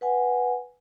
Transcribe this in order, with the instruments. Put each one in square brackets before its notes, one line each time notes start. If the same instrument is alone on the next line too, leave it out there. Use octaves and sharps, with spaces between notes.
[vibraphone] B4 F#5 G#5